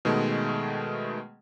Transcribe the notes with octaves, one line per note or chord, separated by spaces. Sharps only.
B2 D#3 G#3 A3